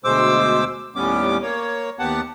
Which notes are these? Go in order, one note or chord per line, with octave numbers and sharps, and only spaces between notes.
D2 B2 G#3 C5 D6 E6
D#2 A2 G3 B3 C#4 D6
A#3 C#5
D#2 B3 G4 F#5 A5